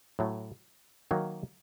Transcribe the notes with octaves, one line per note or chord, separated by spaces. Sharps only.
A2 F#3 A3
D#3 F#3 A#3